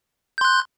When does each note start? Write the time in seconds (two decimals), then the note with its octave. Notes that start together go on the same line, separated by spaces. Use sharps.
0.38 G6
0.41 C6
0.45 F#6